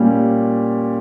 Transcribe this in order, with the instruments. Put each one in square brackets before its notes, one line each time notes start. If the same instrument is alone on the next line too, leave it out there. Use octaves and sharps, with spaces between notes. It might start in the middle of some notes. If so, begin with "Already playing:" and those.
Already playing: [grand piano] A#2 G3 C#4